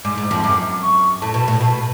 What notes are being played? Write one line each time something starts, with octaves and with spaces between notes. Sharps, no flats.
G#2 D6
G#2
F2
F#2
C#6
A2 A5
B2
A2
B2